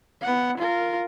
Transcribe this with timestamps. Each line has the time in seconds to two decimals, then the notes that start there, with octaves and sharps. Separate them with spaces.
0.22 B3 F#5
0.57 F4 A#4